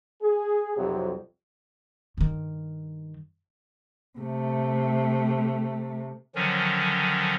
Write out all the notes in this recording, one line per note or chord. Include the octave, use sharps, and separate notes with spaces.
G#4
B1 F2 C3 F#3 G3
G2 D#3
C3 A3
D3 D#3 F3 F#3 C#4